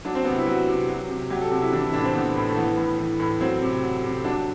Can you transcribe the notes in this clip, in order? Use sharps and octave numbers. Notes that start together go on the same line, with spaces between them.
F#3 D4
C4
C3 B3
E4
F#3 F#4
C3
F#3
C3
F#3 G4
A4
C3 F#4
E4
E3 D4
E4
A2 D4
C4
E3 B3
A2
A3
E3 B3
A2
E3
A2
F#3 C4
C3
F#3
C3
F#3 D4